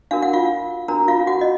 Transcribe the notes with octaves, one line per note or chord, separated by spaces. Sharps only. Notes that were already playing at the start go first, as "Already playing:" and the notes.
D4 F#4 A#4 F5
F#5
F4 F5
D4 F#4 A#4 A#5
F4 F5
F#4 F#5
D#5